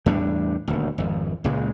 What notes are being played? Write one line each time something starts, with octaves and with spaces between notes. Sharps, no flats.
E2 A2 G3 D4
D#1 D2
G#1 F2
C#2 A#2 C#3 G#3